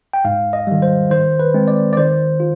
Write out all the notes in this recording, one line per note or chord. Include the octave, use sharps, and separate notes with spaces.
G5
G#2 F5
D#5
D#3 G3
C5
D#3 C5
B4
G#3 C4
D5
D5
D#3 C5
F4